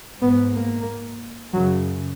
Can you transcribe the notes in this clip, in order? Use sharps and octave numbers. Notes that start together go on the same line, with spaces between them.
G#2 B3
A#3
F#2 C#3 F#3